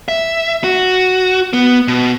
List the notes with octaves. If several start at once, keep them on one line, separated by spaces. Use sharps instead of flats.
E5
F#4
B3
B2